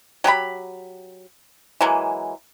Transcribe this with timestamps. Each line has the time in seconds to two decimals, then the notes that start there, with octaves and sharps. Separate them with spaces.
0.24 F#3 G4 G#4 B5
1.81 E3 F#3 G#3 A#3